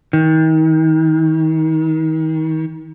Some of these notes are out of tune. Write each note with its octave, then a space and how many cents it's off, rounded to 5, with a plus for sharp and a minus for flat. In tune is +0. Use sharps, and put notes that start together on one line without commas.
D#3 +35